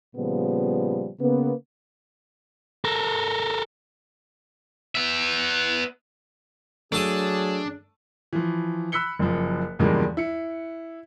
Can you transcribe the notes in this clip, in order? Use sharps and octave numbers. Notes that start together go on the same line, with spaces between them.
A#2 C#3 F3 G3 B3
C#3 A#3 B3
A4 A#4
B3 E5
F#3 A3 D4 G#4 A5 D#6
E3 F3
B5 E6 F#6 B6 C#7 G7
F#1 F#2 F3
E2 G2 C#3 F3 G#3 A#3
E4 C#7